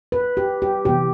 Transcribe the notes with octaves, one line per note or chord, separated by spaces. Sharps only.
B4
G4
G4
C3 E3 B3 G4